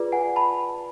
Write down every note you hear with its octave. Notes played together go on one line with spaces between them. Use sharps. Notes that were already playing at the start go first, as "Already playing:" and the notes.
Already playing: F4 G#4 B4 D5
F#5 G#5
A5 B5